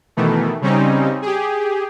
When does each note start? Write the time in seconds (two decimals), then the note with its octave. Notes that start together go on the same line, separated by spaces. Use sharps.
0.17 B2 D#3 E3 A3
0.61 C#3 G3 C4 C#4 D#4
1.22 G4 G#4